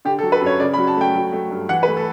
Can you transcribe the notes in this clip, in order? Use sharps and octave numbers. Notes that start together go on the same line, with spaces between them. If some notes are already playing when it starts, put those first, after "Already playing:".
D3 G4
A4
F#3
B4
F#2 C#5
C#3 D5
B5
F#3
A5
A3 G5
F#3
A3
G2
E3 F#5
B4
A3
A4